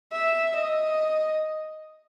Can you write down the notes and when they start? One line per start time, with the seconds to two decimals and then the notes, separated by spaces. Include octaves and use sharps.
0.12 E5
0.56 D#5